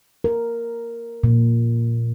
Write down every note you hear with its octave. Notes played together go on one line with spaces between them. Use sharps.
A#4
A#2